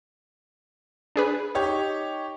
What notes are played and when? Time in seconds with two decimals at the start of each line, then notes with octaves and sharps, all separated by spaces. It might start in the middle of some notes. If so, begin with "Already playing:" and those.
1.16 D4 G#4 B4
1.55 D#4 G4 C#5